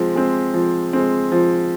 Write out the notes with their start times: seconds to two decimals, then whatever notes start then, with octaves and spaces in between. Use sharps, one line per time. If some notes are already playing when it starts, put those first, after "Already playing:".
Already playing: F3 G#3 C4
0.15 G#3 C4
0.54 F3
0.93 G#3 C4
1.32 F3